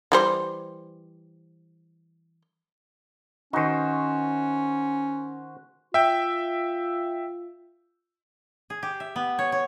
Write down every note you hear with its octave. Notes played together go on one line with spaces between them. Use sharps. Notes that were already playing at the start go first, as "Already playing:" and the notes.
E3 G3 C5
D#3 C#4 D#4 F#4 C5
F4 E5 G5
G#4
G4
E5
B3
C#5
C#5